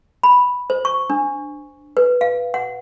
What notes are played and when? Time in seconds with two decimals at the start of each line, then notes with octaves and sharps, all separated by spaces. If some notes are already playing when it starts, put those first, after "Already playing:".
0.23 B5
0.70 C5
0.85 C#6
1.10 D4
1.97 B4
2.21 F5
2.54 F#5